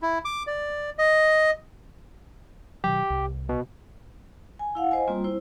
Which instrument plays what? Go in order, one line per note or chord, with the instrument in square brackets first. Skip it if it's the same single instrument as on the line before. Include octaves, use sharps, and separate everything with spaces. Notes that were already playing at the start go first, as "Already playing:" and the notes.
[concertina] E4
D6
D5
D#5
[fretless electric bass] B2 D#3 F#3 [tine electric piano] G4
[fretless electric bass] C2
[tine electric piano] B2
[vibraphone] G#5
E4 F5 F#5
C5 D#5 G#5
G3 A#3 C4 F4
E4 C5